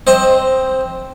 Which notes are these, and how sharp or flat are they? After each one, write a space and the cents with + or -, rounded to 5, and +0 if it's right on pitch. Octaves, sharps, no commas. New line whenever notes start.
C4 +0 C5 +15 D#5 +5